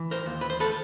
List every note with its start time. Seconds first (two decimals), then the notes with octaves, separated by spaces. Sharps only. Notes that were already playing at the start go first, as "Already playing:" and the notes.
Already playing: E3
0.11 A#4 C5
0.26 D#2
0.41 B4
0.50 C5
0.60 A4 B4